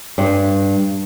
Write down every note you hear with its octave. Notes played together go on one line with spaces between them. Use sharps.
G2